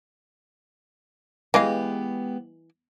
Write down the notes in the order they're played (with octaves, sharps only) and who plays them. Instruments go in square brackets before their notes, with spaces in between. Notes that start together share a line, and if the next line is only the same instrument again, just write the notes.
[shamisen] E3 D#5 F5 [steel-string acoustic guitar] G#3 B3 G4